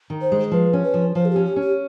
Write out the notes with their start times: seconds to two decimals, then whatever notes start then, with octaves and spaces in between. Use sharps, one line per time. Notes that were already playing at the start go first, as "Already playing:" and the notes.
0.10 D#3
0.21 C5
0.32 G#3
0.51 F3 B4
0.73 C#4
0.84 B4
0.94 F3
1.15 F3 C5
1.25 G#4
1.31 G4
1.36 C#4
1.46 G4
1.56 C#4
1.61 G4